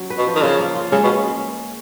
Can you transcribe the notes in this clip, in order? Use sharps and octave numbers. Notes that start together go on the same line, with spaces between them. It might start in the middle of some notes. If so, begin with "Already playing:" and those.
Already playing: F#3 C#4
B4
B2
F3
D#3
C#3 F4
A#3
F4
C#3 G#3
B2
C#4